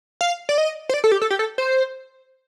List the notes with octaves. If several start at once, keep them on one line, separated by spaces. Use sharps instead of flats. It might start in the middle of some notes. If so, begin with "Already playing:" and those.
F5
D5
D#5
C5
D5
A4
G4
A4
G4
A4
C5